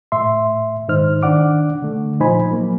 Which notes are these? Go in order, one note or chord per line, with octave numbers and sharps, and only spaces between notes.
A2 E5 C6
G#2 D#3 D#4 C5 F6
D#3 D4 D5 F#5 D6
D3 A3
A#2 F3 D#4 C5 G#5 B5
F#3 A#3